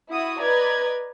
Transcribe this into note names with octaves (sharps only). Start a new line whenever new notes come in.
E4 F#4 D#6
B4 D5 D#5 A#5 G#6